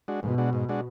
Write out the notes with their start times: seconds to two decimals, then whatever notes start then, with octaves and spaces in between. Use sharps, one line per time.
0.08 G#3 D4 F#4
0.22 G#2 B2
0.38 G#3 D4 F#4
0.53 G#2
0.69 G#3 D4 F#4